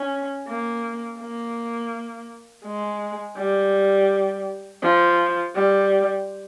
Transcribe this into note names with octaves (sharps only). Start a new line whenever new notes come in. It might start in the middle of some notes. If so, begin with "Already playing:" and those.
Already playing: C#4
A#3
A#3
G#3
G3
F3
G3